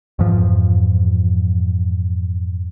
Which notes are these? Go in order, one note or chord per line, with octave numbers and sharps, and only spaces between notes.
F2 G#2 E3 F3